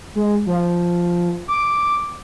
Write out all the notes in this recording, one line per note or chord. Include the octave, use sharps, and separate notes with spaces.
G#3
F3
D6